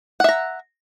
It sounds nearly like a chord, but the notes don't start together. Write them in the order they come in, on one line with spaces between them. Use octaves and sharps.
F#5 E5 A#5